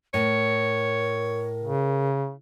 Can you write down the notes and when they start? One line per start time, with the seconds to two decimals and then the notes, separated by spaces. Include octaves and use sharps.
0.14 A2 A#4 C#5
1.63 C#3